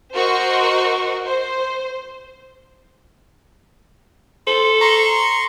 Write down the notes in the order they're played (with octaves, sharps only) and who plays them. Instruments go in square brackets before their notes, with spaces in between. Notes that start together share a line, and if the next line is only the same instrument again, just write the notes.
[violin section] F#4 A#4 C5 D#5 C#6
C5
[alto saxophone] A4 [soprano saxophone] C5
[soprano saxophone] A#5 [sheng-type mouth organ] C6 C#6